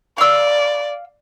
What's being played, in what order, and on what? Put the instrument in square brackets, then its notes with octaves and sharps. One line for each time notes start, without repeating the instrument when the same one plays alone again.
[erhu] D5 [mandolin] F5 E6